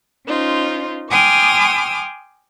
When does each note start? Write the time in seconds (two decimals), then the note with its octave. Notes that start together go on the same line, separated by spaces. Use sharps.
0.26 C#4 D#4 F4 C5
1.10 G5 G#5 C6 D6 D#6 F6